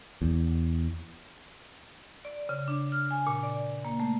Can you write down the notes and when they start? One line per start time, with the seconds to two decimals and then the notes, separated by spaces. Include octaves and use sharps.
0.22 E2
2.25 D5
2.49 C#3
2.68 D4
2.92 F6
3.11 G#5
3.27 A#2
3.43 D5
3.84 A#3
4.00 A3